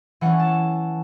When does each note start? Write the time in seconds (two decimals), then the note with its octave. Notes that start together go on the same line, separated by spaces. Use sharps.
0.21 E3 A3 C#4 F#5
0.40 A5